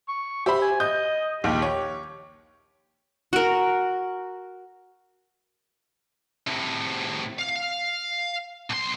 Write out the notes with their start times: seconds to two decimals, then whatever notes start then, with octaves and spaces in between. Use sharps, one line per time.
0.08 C#6
0.46 G4 C5 E5 B5
0.62 G#5
0.80 D#5 G6
1.44 A#1 D#2 D#3 G4
1.62 C#5
3.33 F#4 A#4
6.47 A2 C3
7.39 F5
8.70 B1 C6